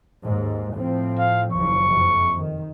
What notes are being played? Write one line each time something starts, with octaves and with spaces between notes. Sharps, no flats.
D#2 G#2
A2 F3 C4
F5
F#1 D#2 F3 C#6
F2 C3
D#3